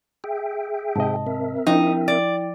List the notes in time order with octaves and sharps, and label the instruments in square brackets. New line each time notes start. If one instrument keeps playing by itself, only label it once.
[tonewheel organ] G#4 E5 G5
[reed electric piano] G#2 C3 D#5 [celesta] A5
[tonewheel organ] C4 A#4 E5
[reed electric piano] F3 [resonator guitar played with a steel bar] D#4 [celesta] E4 G5
[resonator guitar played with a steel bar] D5